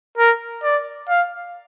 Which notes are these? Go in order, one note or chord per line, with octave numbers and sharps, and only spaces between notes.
A#4
D5
F5